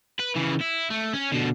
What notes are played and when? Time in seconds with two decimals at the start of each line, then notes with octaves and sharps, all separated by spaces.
0.20 B4
0.36 C#3 E3
0.61 E4
0.90 A3
1.13 C#4
1.32 B2 D3